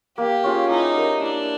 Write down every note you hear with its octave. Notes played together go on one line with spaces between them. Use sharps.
A#3 G4
C#4 F4 G#4
D#4 E4
G4 A#4 D5
D4 E4